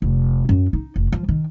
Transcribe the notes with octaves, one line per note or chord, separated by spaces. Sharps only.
F1
F#2
D#4
F1
F3
D#3